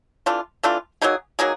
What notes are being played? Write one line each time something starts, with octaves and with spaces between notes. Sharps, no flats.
E3 A3 D4 F4
E3 A3 D4 F4
F#3 A#3 D#4 G#4
F#3 A#3 D#4 G#4